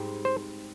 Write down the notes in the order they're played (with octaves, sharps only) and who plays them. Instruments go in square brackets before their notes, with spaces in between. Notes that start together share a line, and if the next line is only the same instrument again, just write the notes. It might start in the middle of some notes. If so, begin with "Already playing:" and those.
Already playing: [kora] G#2 G3 C4
[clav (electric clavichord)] C5